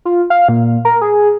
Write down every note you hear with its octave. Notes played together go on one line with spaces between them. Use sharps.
F4
F5
A#2
A#4
G#4